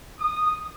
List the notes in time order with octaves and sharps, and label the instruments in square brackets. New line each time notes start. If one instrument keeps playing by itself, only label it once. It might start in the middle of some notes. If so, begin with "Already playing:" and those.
[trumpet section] D#6